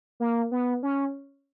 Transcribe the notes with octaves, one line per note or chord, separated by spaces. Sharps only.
A#3
B3
C#4